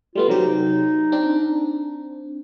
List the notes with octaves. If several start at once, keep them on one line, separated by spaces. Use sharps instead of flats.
G3 A3 B3 F4
C3 F#3 D#4 G4
C4 D4